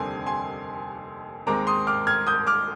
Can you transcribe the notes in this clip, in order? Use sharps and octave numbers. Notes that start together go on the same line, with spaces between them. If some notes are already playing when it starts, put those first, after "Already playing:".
Already playing: F1 D#2 D3 G3 C4 G#5 C6
G#5 C6
D#2 D#3 G#3 C4 A#5 D6
C6 D#6
D6 F6
F6 G#6
D#6 G6
D6 F6